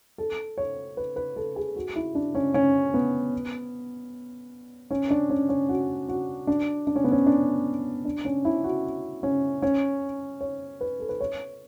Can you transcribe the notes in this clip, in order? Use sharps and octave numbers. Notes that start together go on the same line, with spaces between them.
A4
C#5
B4
B4
A4
G#4
F#4
E4
D4
C#4
C#4
B3
C#4
D4
C#4
C#4
F#4
F#4
D4
D4
C#4
B3
C#4
D4
D4
C#4
E4
F#4
C#4
C#4
C#5
B4
A4
B4
C#5